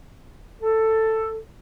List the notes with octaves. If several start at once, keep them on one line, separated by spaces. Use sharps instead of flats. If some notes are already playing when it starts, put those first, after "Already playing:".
A4